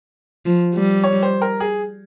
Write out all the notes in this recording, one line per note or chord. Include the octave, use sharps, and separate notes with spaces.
F3
G3
C#5
C5
A#4
G#4